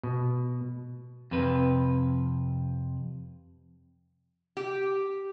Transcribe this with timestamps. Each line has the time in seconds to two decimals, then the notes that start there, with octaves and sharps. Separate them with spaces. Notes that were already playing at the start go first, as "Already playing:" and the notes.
0.03 B2
1.31 F2 C3 B4
4.57 G4